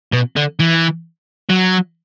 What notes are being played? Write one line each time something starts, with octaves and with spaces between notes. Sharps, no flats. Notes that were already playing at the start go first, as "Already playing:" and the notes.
B2
D3
E3
F#3